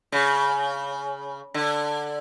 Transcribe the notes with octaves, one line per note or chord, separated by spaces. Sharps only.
C#3
D3